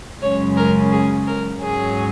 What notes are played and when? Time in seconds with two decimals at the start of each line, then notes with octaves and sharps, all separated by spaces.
0.22 F#2 C#3 G#3 C#4 C#5
0.56 A#4
0.91 G#4
1.26 A#4
1.61 G#2 F#3 C#4 G#4